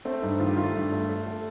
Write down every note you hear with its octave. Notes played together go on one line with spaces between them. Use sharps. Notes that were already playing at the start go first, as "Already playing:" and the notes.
A3 C4
G2 D#4
D#3 F4
G4
A3 F4
G2
A3
A3
A3